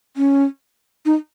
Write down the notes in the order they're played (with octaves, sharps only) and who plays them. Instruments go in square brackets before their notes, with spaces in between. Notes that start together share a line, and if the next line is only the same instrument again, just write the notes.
[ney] C#4
D#4